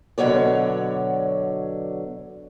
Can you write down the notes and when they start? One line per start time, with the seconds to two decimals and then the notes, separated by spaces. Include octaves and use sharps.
0.18 B2 D3 F#3 C#5 D5